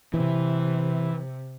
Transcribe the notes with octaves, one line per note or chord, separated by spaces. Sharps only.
C3 E3